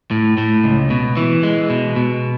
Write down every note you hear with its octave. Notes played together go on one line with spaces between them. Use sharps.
A2
A2
C#2
B2
E3
G#3
B2
B2